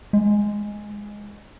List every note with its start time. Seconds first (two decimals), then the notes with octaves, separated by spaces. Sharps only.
0.13 G#3